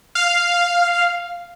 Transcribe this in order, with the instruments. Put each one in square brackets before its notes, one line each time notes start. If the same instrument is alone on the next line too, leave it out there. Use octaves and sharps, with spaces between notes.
[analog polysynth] F5